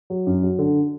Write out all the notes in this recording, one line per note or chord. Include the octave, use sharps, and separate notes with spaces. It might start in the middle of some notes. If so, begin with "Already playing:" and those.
F#3
F#2
F#3
D3